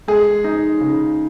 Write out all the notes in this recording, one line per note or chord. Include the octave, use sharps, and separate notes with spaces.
G#3 G#4
D#4
C#3